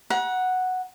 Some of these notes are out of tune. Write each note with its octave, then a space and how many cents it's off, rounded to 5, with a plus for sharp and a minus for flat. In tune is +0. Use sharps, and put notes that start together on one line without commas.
F#5 +0 A#5 +45